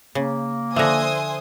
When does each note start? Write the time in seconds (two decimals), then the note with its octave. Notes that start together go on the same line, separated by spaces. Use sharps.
0.15 C#3 A#3
0.76 D3 F3 C5 E5 G#5 D#6 F#6 A#6